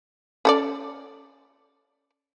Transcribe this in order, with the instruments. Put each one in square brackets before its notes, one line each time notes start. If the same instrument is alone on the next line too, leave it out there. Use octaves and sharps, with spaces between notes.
[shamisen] C#4 A4 D5